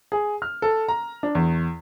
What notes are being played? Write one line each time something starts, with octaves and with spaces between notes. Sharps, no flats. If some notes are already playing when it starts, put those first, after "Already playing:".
G#4
F6
A4
A#5
D4
E2